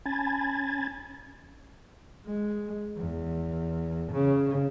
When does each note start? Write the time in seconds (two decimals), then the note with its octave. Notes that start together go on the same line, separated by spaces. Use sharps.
0.05 C#4 G#5 A5 B5 G#6 A6
2.26 G#3
2.97 E2
4.12 C#3